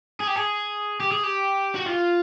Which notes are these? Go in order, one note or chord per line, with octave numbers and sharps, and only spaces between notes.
G#4
G4
G#4
G4
G#4
G4
F#4
F4